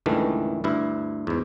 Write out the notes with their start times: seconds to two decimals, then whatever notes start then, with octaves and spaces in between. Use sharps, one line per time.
0.06 C#2 G2 D#3 E3 A3
0.64 D2 G2 E4
1.27 E2 G#2